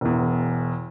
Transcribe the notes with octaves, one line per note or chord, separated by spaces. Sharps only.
E1 E2